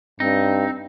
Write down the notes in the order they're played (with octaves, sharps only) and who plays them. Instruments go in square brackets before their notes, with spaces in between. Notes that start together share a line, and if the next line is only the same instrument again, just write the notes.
[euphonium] G2 [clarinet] C4 [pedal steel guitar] D#4